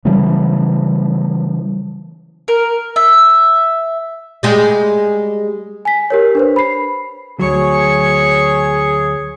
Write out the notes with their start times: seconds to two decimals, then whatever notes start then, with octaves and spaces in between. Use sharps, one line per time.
0.05 C#3 E3 F#3 G3
2.48 A#4
2.96 E5
4.43 G3 G#3 G4
5.85 G#5 B6
6.10 G4 A#4 C#5
6.35 D4 B4 C5
6.56 B5 C7
7.39 D2 F#3 G#4 C#5 C#6